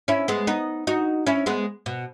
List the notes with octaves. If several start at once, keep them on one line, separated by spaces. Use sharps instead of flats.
C#4 E4
G#3 B3
B3 D#4
D#4 F#4
C#4 E4
G#3 B3
B2